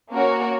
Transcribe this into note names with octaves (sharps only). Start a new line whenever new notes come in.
A#3 C#4 F#4 A#4 C#5